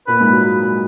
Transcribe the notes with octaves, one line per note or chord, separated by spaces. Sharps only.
A#2 A#3 B4
G#2 G#3
F#3